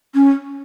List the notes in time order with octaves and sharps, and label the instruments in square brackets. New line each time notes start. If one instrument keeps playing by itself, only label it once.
[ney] C#4